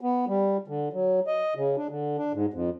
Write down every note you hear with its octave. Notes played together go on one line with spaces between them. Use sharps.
B3
G3
D3
F#3
D#5
C#3
D4
D3
D4
G#2
F2